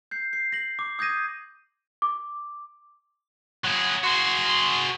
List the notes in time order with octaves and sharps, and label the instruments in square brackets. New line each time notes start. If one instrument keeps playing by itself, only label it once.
[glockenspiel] G6 C7
C7
A#6 F#7
D6
D#6 G6 G#6 A#6 D#7
[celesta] D6
[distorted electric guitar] F#3 G#4
[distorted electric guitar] F#4 G#4 [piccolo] C6